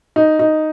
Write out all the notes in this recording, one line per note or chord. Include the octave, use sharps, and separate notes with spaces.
D#4
D#4